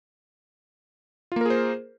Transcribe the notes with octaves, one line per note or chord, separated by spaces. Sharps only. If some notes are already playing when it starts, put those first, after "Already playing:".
A#3 F4 G#4 A#4 C5